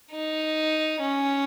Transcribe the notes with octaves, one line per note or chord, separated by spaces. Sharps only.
D#4
C#4